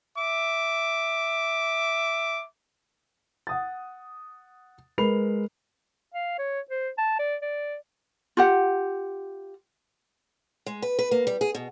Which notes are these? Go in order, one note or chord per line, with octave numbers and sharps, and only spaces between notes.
E5 D6
F#5 D#6 A6
G#3 A#4 B4 B5 C7 F7
F5
C#5
C5
A5
D5
D5
F4 G4 F#5
G#3
B4
B4
A#3
G3
G#4
B2